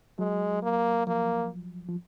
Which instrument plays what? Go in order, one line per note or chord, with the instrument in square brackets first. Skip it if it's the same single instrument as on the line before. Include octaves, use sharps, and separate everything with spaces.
[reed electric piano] F#3 [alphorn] G#3
[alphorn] A#3
[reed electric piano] F3 [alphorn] A#3
[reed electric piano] F3